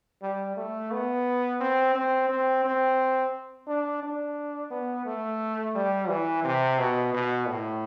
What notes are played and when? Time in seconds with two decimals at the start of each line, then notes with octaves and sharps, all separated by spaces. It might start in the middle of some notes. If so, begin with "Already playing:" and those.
0.22 G3
0.57 A3
0.92 B3
1.60 C4
1.95 C4
2.29 C4
2.64 C4
3.67 D4
4.03 D4
4.71 B3
5.06 A3
5.75 G3
6.09 E3
6.44 C3
6.79 B2
7.14 B2
7.48 A2